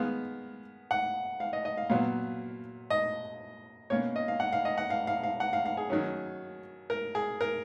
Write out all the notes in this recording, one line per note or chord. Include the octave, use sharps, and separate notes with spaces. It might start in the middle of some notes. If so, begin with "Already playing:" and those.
Already playing: D#3 G#3 B3 F5
F#5
F5
D#5
D#5
F5
A#2 F#3 B3 F5
D#5
B2 A#3 C#4 C#5
D#5
F5
F#5
F5
D#5
F#5
F5
F5
F5
F#5
F5
F5
G#4
D#3 F#3 C#4
A#4
G#4
A#4